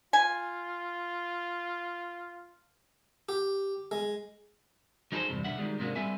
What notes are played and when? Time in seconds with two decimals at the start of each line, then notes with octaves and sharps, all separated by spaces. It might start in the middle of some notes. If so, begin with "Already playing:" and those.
0.13 F4 G#5
3.29 G4
3.91 G#3
5.12 F#3 D#4 G#4 A4 B4 C5
5.30 E2 G2 C3
5.45 B1 D3 E5 F#5
5.58 D#3 E3 G3 G#3
5.79 G#2 C3 G#3 A#3 D4 F#4
5.95 G3 B3 C4 A4 E5 G#5